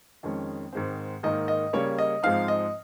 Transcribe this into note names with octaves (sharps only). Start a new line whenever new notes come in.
F2 D#3 G#3 C#4
G#2 D#3 G#3 C4
G#2 D#3 A#3 D#4 D#5
D#5
C#3 G3 A#3 C#4 C#5
D#5
G#2 F3 G#3 C4 D#4 F5
D#5